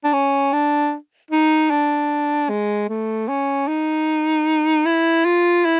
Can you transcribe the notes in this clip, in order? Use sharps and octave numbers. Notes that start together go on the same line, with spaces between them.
D4
C#4
D4
D#4
D4
G#3
A3
C#4
D#4
E4
F4
E4